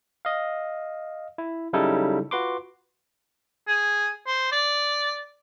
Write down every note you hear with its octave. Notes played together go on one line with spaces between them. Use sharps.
D#5 F5
E4
C#3 F#3 G3 D#4 E4 A4
F4 F#4 B4 C6 D6
G#4
C5
D5